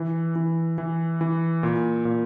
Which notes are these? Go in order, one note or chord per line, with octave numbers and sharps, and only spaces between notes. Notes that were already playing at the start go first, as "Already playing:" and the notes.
Already playing: E3
E3
E3
E3
A#2
A#2